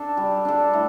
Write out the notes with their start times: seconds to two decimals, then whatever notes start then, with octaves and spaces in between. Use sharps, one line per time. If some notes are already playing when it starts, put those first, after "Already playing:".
Already playing: D4 A4
0.17 G3
0.45 D4 A4
0.73 A2